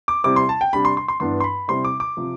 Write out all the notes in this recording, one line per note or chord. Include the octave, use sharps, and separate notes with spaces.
D6
C3 G3 C4 E4 D6
C6
A5
G5
C3 G3 D4 B5
C6
C6
C6
G2 E3 B3 D4 C6
C6
B5
C3 G3 C4 E4 C6
D6
D6
C3 F3